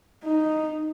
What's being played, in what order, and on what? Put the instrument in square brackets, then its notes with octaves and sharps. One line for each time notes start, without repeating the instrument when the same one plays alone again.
[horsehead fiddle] D#4